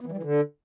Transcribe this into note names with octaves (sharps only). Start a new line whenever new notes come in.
B3
E3
G3
E3
D3